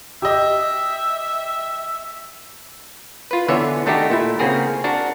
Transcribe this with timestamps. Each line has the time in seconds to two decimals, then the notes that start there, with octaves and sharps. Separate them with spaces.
0.22 G4 D#5 E5
3.31 F4 B4
3.48 D3 E3 B3 C#5 E5 G#5
3.86 D#3 A3 D4 D#4 F#4 G4
4.10 A#2 A3 E4
4.39 C#3 A#3 C4 F#4 G#4 A#4
4.84 D4 F#4 A#4